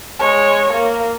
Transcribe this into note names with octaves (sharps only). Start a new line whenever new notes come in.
G#3 C#5
A#3